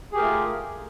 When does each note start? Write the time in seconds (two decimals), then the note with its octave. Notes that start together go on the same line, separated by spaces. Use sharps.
0.12 G#4
0.15 G4
0.18 A#4
0.20 A3
0.23 F4